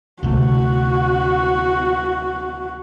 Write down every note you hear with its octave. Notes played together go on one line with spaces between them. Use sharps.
D2 C3 A3 F#4